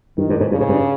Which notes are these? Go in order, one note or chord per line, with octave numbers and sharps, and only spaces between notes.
G2 D#3
G2
G#2
G2 C#3
G#2
G2